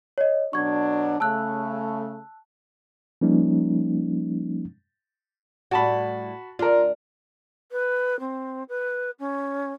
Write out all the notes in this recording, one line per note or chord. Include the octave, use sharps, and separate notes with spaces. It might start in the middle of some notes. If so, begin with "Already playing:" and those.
C#5 D#5
B2 F#3 D4 C#6 G#6
C#3 A3 A5 E6 F#6
F3 G3 A#3 C#4 D#4
A2 G3 F#4 A5 B5
D2 D4 F4 A#4
B4
C4
B4
C#4